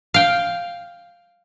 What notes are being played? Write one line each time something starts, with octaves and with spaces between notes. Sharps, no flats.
F5 G5